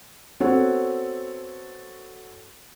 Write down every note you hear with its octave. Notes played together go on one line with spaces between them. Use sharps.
B3 C4 F#4 A4 C#5 F#5